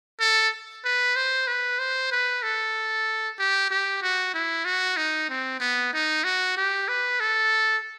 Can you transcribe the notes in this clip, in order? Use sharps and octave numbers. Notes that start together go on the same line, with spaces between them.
A4
B4
C5
B4
C5
B4
A4
G4
G4
F#4
E4
F#4
D#4
C4
B3
D#4
F#4
G4
B4
A4